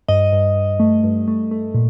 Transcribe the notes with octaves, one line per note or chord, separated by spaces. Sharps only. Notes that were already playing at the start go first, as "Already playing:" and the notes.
G2 D#5
G2
G2
A3
G2
A3
A3
A#2